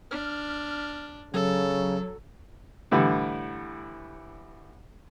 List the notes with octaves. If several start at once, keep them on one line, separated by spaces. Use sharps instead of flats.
D4 F6
C#3 F#3 A4
A2 D3 E3 G3